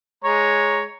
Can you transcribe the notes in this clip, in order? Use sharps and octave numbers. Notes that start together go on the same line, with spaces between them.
G#3 C#5 A#5